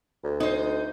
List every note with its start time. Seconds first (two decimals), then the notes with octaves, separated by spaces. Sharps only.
0.24 D2
0.40 D#4 C5